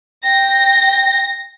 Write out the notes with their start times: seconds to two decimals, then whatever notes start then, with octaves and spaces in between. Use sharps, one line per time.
0.24 G5 A#6